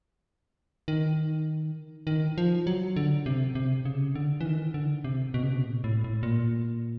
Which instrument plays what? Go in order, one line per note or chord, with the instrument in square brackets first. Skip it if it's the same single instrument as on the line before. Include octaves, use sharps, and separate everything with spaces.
[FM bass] D#3
D#3
F3
F#3
D3
C3
C3
C#3
D3
E3
D#3
D3
C3
B2
C#3
C3
B2
A#2
A2
A2
A#2